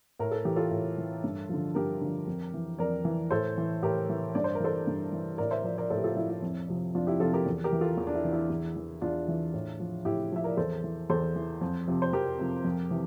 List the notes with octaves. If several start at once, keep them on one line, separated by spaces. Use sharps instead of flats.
A2 A#4
A4
E3 G4
F4 A4
A2
E3
G2
D3 F3
G2 G4 A#4
D3 F3
F2
E3
F2 A#4 D5
E3
A2 A4 C5
E3
A2 G4 A#4
E3
G2 D5
C5
A#4
E3 A4 C5
G2
E3
A2 A#4 D5
C5 E5
F3 A#4 D5
A#4 D5
A2 A4 C5
G4
F4 A4
F3 E4
E4
F2
C3 F3
F2 D4 F4
E4 G4
C3 F3 F4 A4
G4 A#4
E2
G4 A#4
E3
F4 A4
E2
D4
E4
E3
E4
E2
E3
E2 D4 F4
E3
A2
F3
A2 E4 G4
F3 E5
A#4 D5
E2 A4 C5
E3
E2 A4 C5
E3
F2
C3 F3
C5
F2 G4 A#4
C3 F3
F2
C3 E3